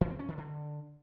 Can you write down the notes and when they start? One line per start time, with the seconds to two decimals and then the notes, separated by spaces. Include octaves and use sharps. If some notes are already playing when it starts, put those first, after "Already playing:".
0.01 E3
0.10 C4
0.19 C#4
0.28 D#3
0.38 D3